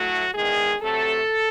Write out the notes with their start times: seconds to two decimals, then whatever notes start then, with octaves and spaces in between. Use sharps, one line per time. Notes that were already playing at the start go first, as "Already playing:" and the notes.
Already playing: A2 F#3 A3 F#4
0.34 E2 D#3 G#3 G#4
0.82 C3 F#3 A3 A4